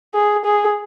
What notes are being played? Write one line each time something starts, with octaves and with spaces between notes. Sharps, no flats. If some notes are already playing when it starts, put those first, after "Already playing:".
G#4
G#4